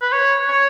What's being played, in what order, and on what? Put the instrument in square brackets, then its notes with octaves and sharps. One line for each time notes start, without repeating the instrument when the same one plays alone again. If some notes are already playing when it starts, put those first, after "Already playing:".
[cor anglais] B4
C#5
C#5